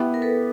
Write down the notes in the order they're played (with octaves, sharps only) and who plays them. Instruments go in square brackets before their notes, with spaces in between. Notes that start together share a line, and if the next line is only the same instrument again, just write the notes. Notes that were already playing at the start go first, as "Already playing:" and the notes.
Already playing: [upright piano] B3 E4 G4
[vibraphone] A#4
A4 B4